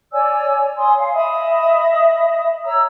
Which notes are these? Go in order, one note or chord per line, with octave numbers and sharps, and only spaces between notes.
C#5 D5 G#5 E6
C#5 G#5 C6 D#6
F5
D#5 E5 B5 D#6
C#5 A#5 E6